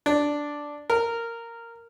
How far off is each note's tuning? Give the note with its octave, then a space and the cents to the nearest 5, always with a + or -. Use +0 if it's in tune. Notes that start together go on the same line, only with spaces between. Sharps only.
D4 -5
A#4 -10